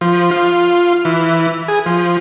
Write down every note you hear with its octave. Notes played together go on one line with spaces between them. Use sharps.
F3
F4
E3
G#4
F3